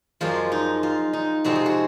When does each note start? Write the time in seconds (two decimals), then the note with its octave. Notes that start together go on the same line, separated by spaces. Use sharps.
0.21 F#2 F3 G#3 F4
0.52 D#4
0.83 F4
1.13 D#4
1.44 F2 C3 F3 G#3 C4 F#4
1.56 G#4
1.66 F#4